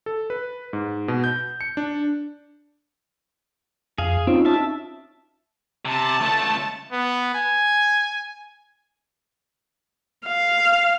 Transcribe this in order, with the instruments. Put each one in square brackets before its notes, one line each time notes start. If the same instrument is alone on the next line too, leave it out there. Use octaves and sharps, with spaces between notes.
[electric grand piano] A4
B4
G#2
B2
G6
C#7
D4
[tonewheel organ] F2 [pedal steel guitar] G#4 F5
[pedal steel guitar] C4 [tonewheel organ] C#4 D#4 F4
[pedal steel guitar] E5 A5
[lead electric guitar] C3 [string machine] A5
[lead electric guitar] C#2 A3
[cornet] B3
G#5
[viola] F5